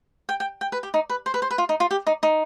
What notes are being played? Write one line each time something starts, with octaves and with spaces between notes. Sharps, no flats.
G5
G5
G5
B4
G4
D#4
B4
C5
B4
C5
B4
F4
D#4
F4
G4
D#4
D#4